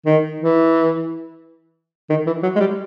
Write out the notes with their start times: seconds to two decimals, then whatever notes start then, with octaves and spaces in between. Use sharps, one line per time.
0.06 D#3
0.40 E3
2.10 D#3
2.26 E3
2.43 F#3
2.56 G#3
2.60 G3